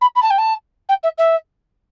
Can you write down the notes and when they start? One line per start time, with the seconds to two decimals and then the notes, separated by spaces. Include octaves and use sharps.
0.01 B5
0.16 B5
0.23 A5
0.30 G5
0.38 A5
0.89 G5
1.04 E5
1.18 E5